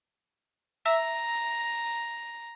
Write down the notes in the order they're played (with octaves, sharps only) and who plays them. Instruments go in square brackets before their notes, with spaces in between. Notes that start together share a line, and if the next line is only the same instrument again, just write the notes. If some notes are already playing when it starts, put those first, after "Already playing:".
[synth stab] E5 [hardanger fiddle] A#5